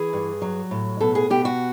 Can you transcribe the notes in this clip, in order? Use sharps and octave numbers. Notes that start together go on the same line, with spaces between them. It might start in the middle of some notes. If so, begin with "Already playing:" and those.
Already playing: E3 G#4
G2
F#3
A2
B2 A4
G#4
B2 G4
F#4